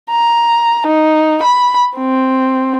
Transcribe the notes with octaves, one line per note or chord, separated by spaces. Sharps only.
A#5
D#4
B5
C4